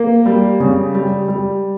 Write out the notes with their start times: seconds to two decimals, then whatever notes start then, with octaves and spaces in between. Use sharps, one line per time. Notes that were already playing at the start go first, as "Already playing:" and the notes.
Already playing: A#3
0.26 G3
0.60 C#3
0.94 G3
1.28 G3